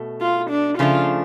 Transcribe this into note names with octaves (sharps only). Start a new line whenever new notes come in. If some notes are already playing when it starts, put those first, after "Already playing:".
Already playing: B2 A3
F4
D4
C#3 F3 A3 D4 F4